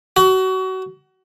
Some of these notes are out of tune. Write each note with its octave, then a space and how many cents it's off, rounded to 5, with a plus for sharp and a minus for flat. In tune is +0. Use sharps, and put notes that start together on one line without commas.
F#4 +30